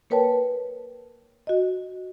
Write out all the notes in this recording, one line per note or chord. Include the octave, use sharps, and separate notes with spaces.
A#3 A#4 B4 C#5 G5 A5
F#4 D#5